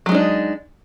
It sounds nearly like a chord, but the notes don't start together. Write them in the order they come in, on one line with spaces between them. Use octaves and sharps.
F#3 G#3 D#4 D4